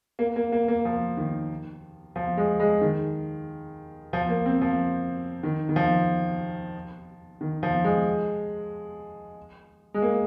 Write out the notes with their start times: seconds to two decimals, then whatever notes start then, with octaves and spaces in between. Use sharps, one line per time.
0.19 A#3
0.36 A#3
0.52 A#3
0.68 A#3
0.85 F3
1.17 D#3
2.16 F3
2.37 G#3
2.60 G#3
2.81 D#3
4.13 F3
4.29 A#3
4.46 C4
4.61 F3
5.43 D#3
5.69 D#3
5.76 F3
7.41 D#3
7.63 F3
7.84 G#3
9.94 G#3
10.02 A#3